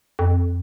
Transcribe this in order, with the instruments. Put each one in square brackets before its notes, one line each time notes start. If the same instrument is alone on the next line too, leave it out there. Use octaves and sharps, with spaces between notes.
[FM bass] F2